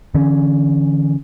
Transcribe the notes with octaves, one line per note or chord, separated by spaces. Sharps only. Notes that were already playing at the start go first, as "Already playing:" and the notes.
D3 E3 C#4